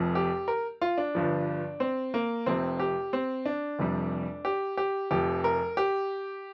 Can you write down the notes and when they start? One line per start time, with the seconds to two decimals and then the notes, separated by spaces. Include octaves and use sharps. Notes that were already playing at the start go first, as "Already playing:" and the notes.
Already playing: F1 F2 F3
0.15 G4
0.48 A#4
0.81 F4
0.98 D4
1.15 G1 G2 F3
1.80 C4
2.14 A#3
2.46 F1 F2 C3 C4
2.79 G4
3.13 C4
3.46 D4
3.79 F1 F2 C3 G3
4.45 G4
4.77 G4
5.11 F1 F2 F3 G4
5.44 A#4
5.77 G4